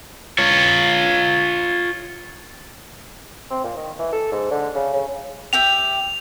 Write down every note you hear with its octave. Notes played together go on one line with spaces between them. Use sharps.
F4 C#5
C4
A#2
D#3
E3
A4
G#2
D3
C#3
C#3
G4 E5 G5 F7